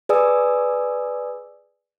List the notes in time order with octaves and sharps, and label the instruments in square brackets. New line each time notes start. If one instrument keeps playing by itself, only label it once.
[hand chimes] G#4 B4 D5 G#5 D#6 E6